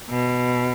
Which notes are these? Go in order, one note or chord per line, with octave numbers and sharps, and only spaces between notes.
B2